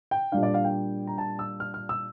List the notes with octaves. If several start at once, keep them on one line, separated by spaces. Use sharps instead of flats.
G5
A#2 G3 D4 F5
D5
F5
G5
A#5
A5
E6
F6
F6
E6